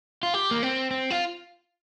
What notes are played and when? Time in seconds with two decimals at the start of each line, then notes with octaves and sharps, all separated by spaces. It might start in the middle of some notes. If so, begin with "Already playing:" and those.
0.23 F4
0.34 G4
0.51 A#3
0.63 C4
0.91 C4
1.10 F4